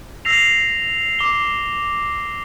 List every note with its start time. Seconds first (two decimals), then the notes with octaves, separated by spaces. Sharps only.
0.25 E6 A#6 C7 F7
1.19 D6 G7